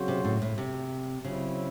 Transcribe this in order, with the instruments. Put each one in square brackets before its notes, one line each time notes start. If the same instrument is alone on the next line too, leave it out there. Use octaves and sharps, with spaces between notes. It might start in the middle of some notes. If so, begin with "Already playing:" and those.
Already playing: [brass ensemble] C#3 F#3 C4 F#4 C5
[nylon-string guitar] C3
A2
A2
C3
[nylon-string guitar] C#3 [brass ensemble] F#3 C4 E4